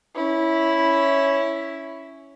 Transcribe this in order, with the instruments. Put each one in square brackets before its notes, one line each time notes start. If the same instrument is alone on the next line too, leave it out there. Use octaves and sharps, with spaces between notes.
[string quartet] C#4 E4